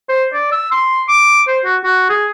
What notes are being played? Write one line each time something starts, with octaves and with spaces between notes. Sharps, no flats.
C5
D5
E6
C6
D6
C5
F#4
F#4
G#4